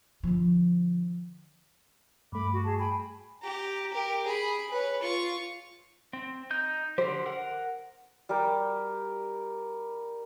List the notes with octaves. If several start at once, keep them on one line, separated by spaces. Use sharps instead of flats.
D3 F3
G2 A3 B5 D6
F#4
G#4 A5
G5 G#5 B5
G4 A#5
G4 A#4
G#4 B5
B4 C#5
F4 C#6
C4
D#4 G6
D3 G4 C5
A#4 F#5
G3 G4 A#4 G5